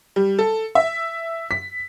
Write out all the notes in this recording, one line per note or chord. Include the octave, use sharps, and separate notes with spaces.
G3
A4
E5
B6